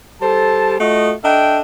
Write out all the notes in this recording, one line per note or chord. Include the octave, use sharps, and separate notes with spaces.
G3 A4 C5 A5
A3 F4 F#4 D#5
D4 A4 D#5 E5 G5